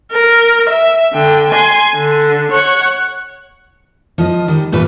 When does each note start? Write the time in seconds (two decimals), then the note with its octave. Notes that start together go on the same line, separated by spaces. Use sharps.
0.12 A#4
0.70 E5
1.13 D3 G5
1.52 G#5 C6
1.95 D3
2.52 C#5 F#5
4.18 F3 D#5
4.48 D#3 G3
4.72 G2 A#2 E3 B4